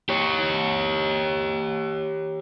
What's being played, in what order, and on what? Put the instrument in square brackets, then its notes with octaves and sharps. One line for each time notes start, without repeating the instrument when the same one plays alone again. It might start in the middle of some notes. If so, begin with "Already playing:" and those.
[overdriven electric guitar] G4 C#5